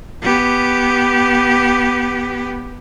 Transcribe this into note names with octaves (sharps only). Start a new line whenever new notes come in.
B3 G4